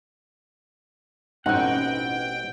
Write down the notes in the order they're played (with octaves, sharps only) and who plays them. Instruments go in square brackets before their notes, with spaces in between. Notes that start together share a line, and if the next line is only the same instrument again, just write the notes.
[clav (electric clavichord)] A1 B2 C4 [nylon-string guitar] C#4 D#4 [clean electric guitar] F#5 [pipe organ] G5